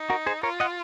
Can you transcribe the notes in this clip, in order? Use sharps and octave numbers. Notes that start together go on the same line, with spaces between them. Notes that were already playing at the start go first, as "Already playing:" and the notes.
Already playing: D#4
F#4 A#4
G#4 C5
F4 A#4 C#5
D#5 F#5